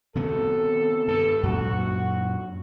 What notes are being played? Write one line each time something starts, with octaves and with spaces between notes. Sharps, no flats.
C3 D#3 B3 A4
G2 A4
F#2 A#2 F#4